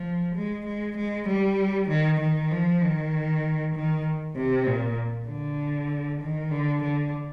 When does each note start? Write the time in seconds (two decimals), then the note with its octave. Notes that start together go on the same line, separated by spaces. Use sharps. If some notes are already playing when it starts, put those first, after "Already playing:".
Already playing: F3
0.35 G#3
0.66 G#3
0.97 G#3
1.28 G3
1.88 D#3
2.20 D#3
2.51 F3
2.81 D#3
3.75 D#3
4.36 C3
4.66 A#2
5.28 D3
6.21 D#3
6.51 D3
6.83 D3